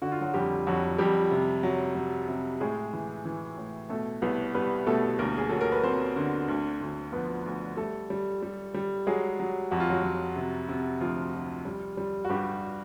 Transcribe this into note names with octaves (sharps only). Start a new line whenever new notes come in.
D3 F#4
F4
F#3 F#4
F2 G3 G4
F2 F#3 F#4
F2 G3 G4
C3
F#3
F#3
C3
A2 G#3 G#4
E3
E3
A2
B2 A3 A4
C2 B3 B4
G3 B3 B4
B2 A3 A4
D2 A#3 A#4
G#4
F#3 A4
A#4
B4
F#3 C4 C5
D3
D2
D2
F3 B3 B4
D2
G3 A3 A4
G3
G3
G3
F#3 G#3 G#4
F#3
F2 F#4
F4
F#3 F#4
F#3
C3
C3
D2 F3 F4
D2
G3
G3
F#4
G2 G3 G4